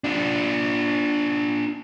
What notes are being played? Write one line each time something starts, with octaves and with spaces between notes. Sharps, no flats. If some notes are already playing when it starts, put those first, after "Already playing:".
D4 F4